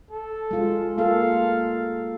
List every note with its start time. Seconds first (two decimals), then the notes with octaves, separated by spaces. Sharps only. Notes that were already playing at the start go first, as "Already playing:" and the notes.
0.11 A4
0.51 G#3 F4
0.98 A#3 F4 A4 F5